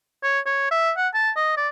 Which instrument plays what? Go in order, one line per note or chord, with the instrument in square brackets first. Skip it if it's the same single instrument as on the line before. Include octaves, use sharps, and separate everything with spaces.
[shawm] C#5
C#5
E5
F#5
A5
D#5
D5